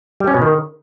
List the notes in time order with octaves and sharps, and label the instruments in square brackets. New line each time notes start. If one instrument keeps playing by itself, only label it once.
[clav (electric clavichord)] G3
C#4
B2
D#3